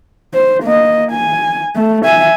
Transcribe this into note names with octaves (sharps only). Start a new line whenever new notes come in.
C5
A#3 D#5
G#5
A3
E5 G#5